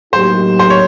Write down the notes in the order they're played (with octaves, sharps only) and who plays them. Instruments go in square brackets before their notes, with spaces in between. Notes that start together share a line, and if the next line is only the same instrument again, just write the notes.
[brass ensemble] A2 F#3 A#3 D#4 G4 [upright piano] C5
[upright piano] C5
C#5